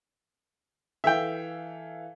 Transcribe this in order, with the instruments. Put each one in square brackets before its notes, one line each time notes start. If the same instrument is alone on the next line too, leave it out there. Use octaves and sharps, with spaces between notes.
[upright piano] E3 A4 F5 [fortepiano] E5 G5